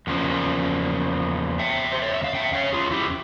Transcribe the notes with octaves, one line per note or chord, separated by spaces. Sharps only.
E2 C#3 F3 A#3
E5 G5
C5
C#5
E5
F5
E5 G5
C#5 F5
F4 G#4
E4 G4